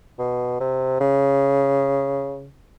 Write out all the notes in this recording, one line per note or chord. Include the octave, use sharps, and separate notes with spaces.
B2
C3
C#3